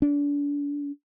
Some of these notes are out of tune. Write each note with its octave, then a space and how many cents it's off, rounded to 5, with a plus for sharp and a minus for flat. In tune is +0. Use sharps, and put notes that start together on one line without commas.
D4 -35